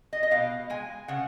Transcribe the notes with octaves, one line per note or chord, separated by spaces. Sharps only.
D#5
D#5
B2 F5
G#3 G#5
C#3 F#5